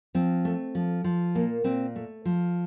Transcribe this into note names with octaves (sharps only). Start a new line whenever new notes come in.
F3 C4
A3
F3
F3
A#2 A#3
A#2 C4
A3
F3